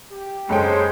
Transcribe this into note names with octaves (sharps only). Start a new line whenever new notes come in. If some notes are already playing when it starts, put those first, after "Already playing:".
G4
F#1 G#3 A4 C5 C#5 G5